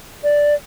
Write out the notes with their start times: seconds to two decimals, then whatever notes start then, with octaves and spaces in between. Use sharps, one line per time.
0.24 D5